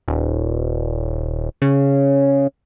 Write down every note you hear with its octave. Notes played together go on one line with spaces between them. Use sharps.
D#1
C#3